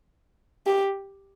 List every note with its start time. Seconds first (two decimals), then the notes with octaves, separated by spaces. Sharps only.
0.66 G4